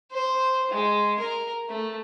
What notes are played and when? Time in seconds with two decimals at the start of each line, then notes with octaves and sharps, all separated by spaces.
0.12 C5
0.71 G#3
1.20 A#4
1.69 A3